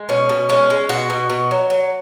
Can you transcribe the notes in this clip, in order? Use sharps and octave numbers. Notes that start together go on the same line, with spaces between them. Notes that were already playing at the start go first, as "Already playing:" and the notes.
Already playing: G#3
B2 C#4
B2
G#3 C#4
G#3
B2 F#4
B2
B2
F#3
F#3